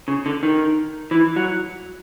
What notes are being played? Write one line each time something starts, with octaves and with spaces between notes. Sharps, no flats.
C#3
D3
D#3
E3
F#3